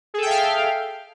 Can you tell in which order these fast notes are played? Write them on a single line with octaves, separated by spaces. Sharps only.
G#4 A4 G5 E5 F5